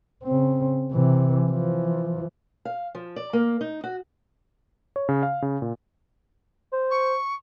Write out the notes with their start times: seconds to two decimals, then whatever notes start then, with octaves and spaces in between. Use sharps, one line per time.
0.23 C#3 C4
0.92 C3 E3
1.51 E3 F3
2.65 F5
2.95 F3
3.16 D5
3.33 A#3
3.61 D#4
3.84 F#4
4.96 C#5
5.09 C#3
5.23 F5
5.42 C#3
5.62 A#2
6.72 C5
6.91 C#6